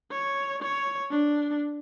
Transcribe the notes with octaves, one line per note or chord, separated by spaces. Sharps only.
C#5
C#5
D4